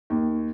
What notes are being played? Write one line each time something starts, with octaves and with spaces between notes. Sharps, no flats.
D#2